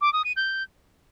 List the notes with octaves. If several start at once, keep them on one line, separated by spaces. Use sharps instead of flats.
D6
D#6
D#7
G6